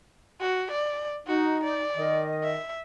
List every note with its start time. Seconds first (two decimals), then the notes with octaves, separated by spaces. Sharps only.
0.40 F#4
0.72 D5
1.27 D#4 F#4
1.64 D5
1.97 D#3 D#5
2.43 E5